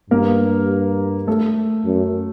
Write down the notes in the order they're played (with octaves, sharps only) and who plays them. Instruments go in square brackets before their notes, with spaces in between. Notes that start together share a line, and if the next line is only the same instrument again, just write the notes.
[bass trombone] G2 [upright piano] A#3 A#4
[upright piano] A3 A4
[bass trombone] F#2